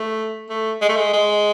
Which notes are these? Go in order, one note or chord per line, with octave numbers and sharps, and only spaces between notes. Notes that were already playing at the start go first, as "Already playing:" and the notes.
Already playing: A3
A3
G#3
A3
G#3
G#3